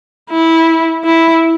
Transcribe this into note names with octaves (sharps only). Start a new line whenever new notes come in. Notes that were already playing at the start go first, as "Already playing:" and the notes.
E4
E4